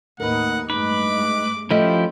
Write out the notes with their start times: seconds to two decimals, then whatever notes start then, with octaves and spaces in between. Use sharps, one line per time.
0.20 D#2 A2 D#4 A#4 B4 F#5
0.70 G2 G#3 A3 D#4 B4 D6
1.71 F3 A3 C#4 E4 G4 D#5